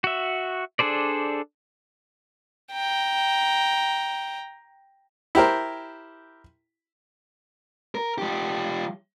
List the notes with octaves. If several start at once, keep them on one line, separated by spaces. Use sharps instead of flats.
F#4 E5
D4 G#4 A4 C5 D5
G5 A#5
E4 G4 A#4 C5
A#4
F3 G4